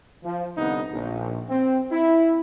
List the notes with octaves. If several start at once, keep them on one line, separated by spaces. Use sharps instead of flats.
F3
C2 D3 B3 D#4
A#1
C4
E4